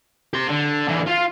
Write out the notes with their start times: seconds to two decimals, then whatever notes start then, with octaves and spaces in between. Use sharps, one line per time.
0.33 G4 C6
0.49 D3
0.88 D3 E3
1.06 F4 F5